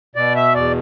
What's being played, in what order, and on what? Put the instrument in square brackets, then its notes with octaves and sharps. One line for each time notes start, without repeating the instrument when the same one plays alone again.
[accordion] B2 D5
E5
E2 D5